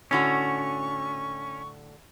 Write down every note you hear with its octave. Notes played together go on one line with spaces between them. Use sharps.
A2 D3 C#4 F#4 C#6